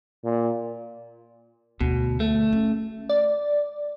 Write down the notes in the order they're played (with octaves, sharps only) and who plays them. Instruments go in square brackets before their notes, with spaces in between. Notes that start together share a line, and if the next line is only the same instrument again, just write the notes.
[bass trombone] A#2
[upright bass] D2 [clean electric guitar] B2
[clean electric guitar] A3
[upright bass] C#4
[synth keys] D5